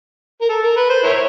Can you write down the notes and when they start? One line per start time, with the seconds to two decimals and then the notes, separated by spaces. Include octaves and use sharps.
0.41 A#4
0.49 A4
0.63 A#4
0.76 B4
0.90 C5
1.04 E4 A#4 C#5